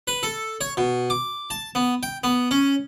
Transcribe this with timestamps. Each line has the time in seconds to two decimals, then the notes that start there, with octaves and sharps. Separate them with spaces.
0.08 B4
0.23 A4
0.61 C#5
0.77 B2
1.10 D6
1.50 A5
1.75 B3
2.03 G5
2.24 B3
2.51 C#4